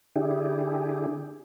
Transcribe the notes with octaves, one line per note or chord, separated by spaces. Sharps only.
D3 D4 E4 G4 G#4